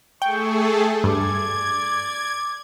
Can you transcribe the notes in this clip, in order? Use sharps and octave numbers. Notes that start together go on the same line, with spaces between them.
A3 G#4 A4 G5 C#6
G2 D5 G#6